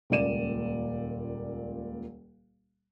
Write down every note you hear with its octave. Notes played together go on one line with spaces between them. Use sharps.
D#1 C#2 A#2 D5 D#7 E7